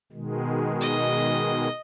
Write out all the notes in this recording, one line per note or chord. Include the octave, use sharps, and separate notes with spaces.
B2 D#3 G#3
D#5